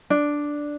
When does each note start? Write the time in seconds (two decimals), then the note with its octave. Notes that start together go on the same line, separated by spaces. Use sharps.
0.10 D4